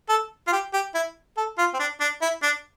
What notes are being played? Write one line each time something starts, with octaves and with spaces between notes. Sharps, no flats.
A4
F4
G4
G4
E4
A4
F4
C4
D4
D4
E4
D4